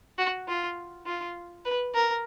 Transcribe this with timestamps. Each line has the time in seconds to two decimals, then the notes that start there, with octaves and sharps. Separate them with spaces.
0.18 F#4
0.48 F4
1.06 F4
1.65 B4
1.94 A#4